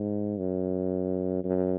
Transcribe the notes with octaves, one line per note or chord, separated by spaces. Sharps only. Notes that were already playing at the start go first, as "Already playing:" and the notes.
Already playing: G#2
F#2
F#2